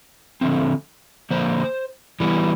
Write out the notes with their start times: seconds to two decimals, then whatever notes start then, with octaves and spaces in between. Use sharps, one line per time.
0.41 D3 F3 A3 C4
1.31 D3 F3 A#3 C5
2.20 E3 G3 B3